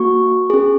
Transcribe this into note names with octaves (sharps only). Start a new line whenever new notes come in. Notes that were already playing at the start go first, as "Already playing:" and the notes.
Already playing: A#3 F#4 C#6
C#4 G#4